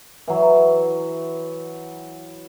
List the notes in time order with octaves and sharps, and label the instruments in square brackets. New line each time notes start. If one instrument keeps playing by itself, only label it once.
[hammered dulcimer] E3 F#3